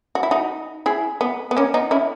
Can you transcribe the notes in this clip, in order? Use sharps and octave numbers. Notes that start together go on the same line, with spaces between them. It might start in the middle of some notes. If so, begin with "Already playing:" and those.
F#4
E4
D#4 F#4
E4 G#4
B3
B3
A#3 C#4
B3 D#4
C#4 E4